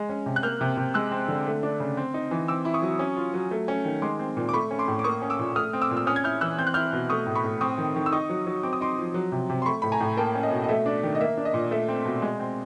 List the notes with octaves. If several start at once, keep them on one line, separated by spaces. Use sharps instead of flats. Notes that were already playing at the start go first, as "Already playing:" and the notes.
Already playing: G#3
C#4
C3
F#6
A#3 F6 G6
C3
C3
G#3 E6 F#6
C4
D3
A3
D4
C#3
C4
D#4
E3
C4 D6 E6
E4
C#6 D#6
F#3
C#4
F4
F#3
A3
C#4
D#3
G#3 C6 D6
C4
A#2
D6
A3 B5 C#6
C#4
C6 D6
A2
D6
A#3 C#6 D#6
C#4
D6 E6
A#2
A3 D#6 F6
C4
D6 E6
A#2
E6
C#4 D#6 F6
G#6
E4 F6 G6
E3 E6 F#6
C4 G6
F#6
E4 F6 G6
B2
A3 C#6 D#6
A2
B5 C#6
A2
C4 C#6 D#6
D#3
D#3
E6
D#4 C#6 D#6
F#3
F#3
C4 D6
D#6
D#4 C6 D6
F3
F#3
C3
C3
C6
A3 B5 C#6
A2 B5
G#5 A#5
A2
A#3 G5 A5
C#4
D#5
B2
D#5
A3 E5
D4
D#3
D#5
A#3 E5
D4
D#5
A#2
A3 E5
C4
B2
G#3
C4